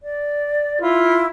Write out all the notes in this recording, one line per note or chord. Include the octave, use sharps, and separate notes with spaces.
D5
E4 F4